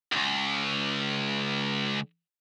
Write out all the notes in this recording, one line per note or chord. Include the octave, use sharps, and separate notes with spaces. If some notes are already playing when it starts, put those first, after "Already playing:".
C#2 F#2